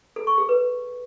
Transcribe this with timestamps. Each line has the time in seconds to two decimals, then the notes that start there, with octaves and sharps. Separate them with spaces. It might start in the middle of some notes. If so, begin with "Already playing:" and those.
0.16 A4
0.27 C#6
0.38 G#4
0.49 B4